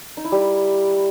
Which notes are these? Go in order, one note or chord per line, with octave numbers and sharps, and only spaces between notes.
D#4
E4
G3